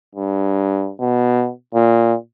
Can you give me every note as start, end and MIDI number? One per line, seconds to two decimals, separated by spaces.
0.15 0.91 43
1.00 1.50 47
1.74 2.15 46